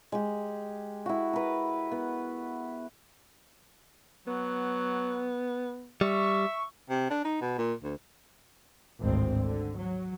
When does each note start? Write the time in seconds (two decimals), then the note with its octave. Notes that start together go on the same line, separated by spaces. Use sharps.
0.12 G#3 G4
1.06 E4 F#4
1.33 B4 A#5
1.92 B3
4.27 F#3 B3
6.01 G3 E5 C#6
6.90 C3
7.11 D4
7.25 D#4
7.42 B2
7.58 A#2
7.84 D2
9.00 G#1 D2 A2 C4
9.41 D3
9.78 F#3